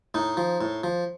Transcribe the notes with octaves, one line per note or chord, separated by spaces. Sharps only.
A2 D#4
F3
A2
F3